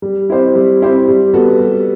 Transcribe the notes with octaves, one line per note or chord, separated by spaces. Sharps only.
G3
C4 E4 G4 C5
G3
C4 E4 G4 C5
G3
B3 F#4 A4
G3